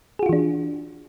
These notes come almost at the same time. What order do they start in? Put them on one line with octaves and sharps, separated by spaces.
G#4 F#4 F4 E3 D4